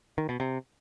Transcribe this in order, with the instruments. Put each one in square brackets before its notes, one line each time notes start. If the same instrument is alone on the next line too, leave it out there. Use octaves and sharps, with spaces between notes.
[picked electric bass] D#3
B2
C3